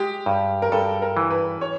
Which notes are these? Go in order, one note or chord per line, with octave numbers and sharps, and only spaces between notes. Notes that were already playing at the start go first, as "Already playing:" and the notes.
Already playing: G#3 G4
G2
A#4
G2 A4
A#4
E3
B4
C#5